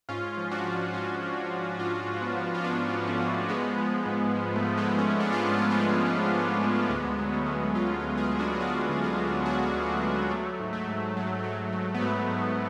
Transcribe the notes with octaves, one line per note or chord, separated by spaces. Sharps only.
G#2 C#4 F4
F3
D4 F#4
F3
G#2 C#4 F4
F3
F3
G#2 C#4 F4
G#2
B3 D4
F3
F4
G#2 B3 D4
F3
A3 C#4
F3
F3 G#3 B3
F3
G#2
F3
A3
F3
G#3 B3
F3
A3 C#4
G#2 D4
F4
G#2 D4
F4
B3 D4
F3
F3 A3 C#4
F3 G#3
G#2 A3
D2 G#3 B3
F#3
A3 C#4
F#3
D2 C#4 F4
D2
F4 G#4
D2
D4 F#4
F#3 F4 G#4
D3
F4 G#4
F#3
F#3 D4 F#4
D2
A3
F#3
F#3 A3
G#2
A3
G#2
F#3
F#3
F#3
B3
G#2 A3
G#2